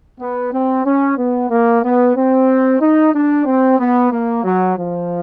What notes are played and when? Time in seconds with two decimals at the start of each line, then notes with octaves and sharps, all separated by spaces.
0.19 B3
0.52 C4
0.84 C#4
1.16 B3
1.49 A#3
1.83 B3
2.15 C4
2.80 D#4
3.13 D4
3.45 C4
3.78 B3
4.11 A#3
4.43 F#3
4.76 F3